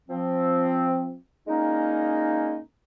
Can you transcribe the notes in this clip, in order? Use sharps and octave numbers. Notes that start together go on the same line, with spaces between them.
F3 C4
A#2 G#3 A#3 C#4 D#4